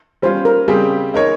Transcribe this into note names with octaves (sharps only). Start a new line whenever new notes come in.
G3 C#4 F4 C5
A#4
C#3 G3 C4 G4 G#4
G#3 D#4 A#4 C#5